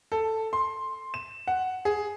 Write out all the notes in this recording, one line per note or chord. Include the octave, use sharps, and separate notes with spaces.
A4
C6
E7
F#5
G#4